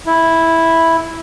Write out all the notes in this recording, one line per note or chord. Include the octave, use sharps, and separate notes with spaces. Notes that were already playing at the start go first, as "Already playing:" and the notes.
E4